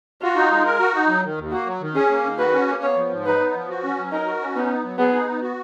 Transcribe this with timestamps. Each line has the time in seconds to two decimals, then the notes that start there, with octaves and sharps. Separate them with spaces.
0.21 F4 F#4
0.36 D#4
0.51 G#3
0.66 A#4
0.79 F#4
0.95 D#4
1.08 F#3
1.24 D#3
1.38 D#2
1.52 A#3 F#4
1.66 F#3
1.81 D#3
1.95 C#4 G#4
2.10 A#3
2.24 D#3
2.38 F#4 B4
2.53 C#4
2.68 A#3
2.82 B3 C#5
2.96 F3
3.12 G#2
3.26 D#4 B4
3.40 B3
3.54 F3
3.69 F#4
3.84 C#4
3.98 F#3
4.12 D#4 A#4
4.26 F#4
4.41 C#4
4.56 B3 D#4
4.70 B3
4.84 F#3
4.98 B3 G#4
5.13 D#4
5.28 B3
5.42 F#4